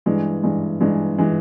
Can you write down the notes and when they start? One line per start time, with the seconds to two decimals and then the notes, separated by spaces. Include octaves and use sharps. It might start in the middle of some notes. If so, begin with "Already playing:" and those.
0.06 G2 E3 G#3
0.43 G2 E3 G#3
0.80 G2 E3 G#3
1.18 E3 G#3